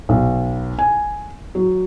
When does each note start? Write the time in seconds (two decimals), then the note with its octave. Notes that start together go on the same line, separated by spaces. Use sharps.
0.09 B1
0.79 G#5
1.55 F#3